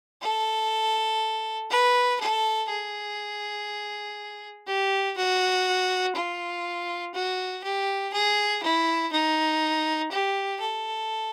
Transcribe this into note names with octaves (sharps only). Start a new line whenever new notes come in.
A4
B4
A4
G#4
G4
F#4
F4
F#4
G4
G#4
E4
D#4
G4
A4